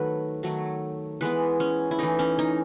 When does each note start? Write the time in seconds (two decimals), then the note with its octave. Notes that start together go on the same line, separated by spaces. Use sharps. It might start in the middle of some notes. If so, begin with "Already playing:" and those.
Already playing: D#3 F#3 A3 B4
0.43 D#3 F#3 A3
1.21 E3 G#3 B3 B4
1.60 C#4
1.91 E4
1.99 E3 A3 D#4
2.19 C#4
2.39 D#4